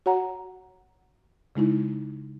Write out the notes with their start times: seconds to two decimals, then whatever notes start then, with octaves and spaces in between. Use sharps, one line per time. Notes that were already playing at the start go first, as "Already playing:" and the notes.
0.06 F#4 C#5 F#5 A#5
1.55 C#3 G#3 D#4 E4